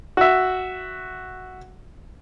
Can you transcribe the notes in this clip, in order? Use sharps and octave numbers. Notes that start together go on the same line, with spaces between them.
F#4 E5